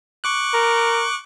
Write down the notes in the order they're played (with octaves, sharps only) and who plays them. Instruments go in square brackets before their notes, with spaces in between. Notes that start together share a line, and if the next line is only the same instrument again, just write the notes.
[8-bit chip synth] C#6 D6 F#6
[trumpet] A#4